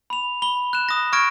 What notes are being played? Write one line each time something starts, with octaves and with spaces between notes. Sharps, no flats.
B5 F7
B5 G7
F#6 E7
D#6 A#6
C#6 F6 G#6 A#6 D7